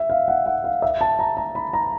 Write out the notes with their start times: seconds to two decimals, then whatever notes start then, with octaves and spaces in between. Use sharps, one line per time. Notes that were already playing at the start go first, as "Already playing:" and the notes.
Already playing: E5
0.10 F5
0.28 F#5
0.46 F#5
0.64 F5
0.82 E5
1.01 A5
1.19 A#5
1.37 A#5
1.55 B5
1.73 A#5